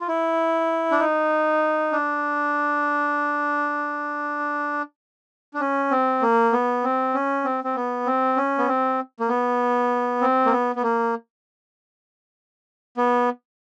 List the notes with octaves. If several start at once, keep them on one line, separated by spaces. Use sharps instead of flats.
F4
E4
D4
D#4
D4
D4
C#4
C4
A#3
B3
C4
C#4
C4
C4
B3
C4
C#4
B3
C4
A#3
B3
C4
A#3
B3
B3
A#3
B3